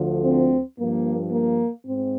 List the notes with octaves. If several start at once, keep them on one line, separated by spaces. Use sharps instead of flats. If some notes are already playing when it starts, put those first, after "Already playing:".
Already playing: D2 D3 F3
C4
G2 F3 A#3
A#3
G#2 C4